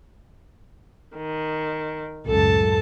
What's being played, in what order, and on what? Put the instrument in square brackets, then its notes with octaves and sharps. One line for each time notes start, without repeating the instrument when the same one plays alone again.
[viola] D#3
[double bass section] C#2 F#2 A2 [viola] A4 A5